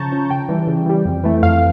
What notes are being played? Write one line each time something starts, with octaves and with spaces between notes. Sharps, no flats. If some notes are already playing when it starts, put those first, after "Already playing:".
Already playing: C#3 F3 C#4 A5 A#5 C#6 G6
F3 C#4
C#3 G5
E3 G3
C#3
E3 G3
F2
E3 A3
F2 F5